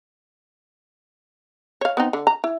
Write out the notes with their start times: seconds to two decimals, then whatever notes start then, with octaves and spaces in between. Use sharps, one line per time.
1.81 C#5 F5
1.97 B3 C4 D#4
2.13 D3
2.27 A#5
2.44 E4